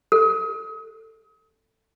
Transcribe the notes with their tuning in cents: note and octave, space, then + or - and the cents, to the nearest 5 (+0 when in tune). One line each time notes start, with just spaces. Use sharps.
A4 +15